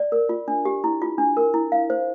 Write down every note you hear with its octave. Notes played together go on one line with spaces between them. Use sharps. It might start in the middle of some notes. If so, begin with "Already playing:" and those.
Already playing: D5
A#4
F4
D4
G4
E4
F4
D4
A#4
E4
F5
C5